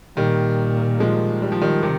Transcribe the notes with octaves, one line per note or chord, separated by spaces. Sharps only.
A#2 D#3 G3
F3 G#3
G3
F3
D#3 G3
C3 D#3